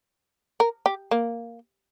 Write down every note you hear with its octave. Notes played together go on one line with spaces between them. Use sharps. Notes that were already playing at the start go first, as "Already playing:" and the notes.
A#4
G4
A#3